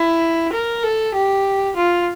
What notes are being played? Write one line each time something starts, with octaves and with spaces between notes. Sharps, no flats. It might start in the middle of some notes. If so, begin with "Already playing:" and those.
Already playing: E4
A#4
A4
G4
F4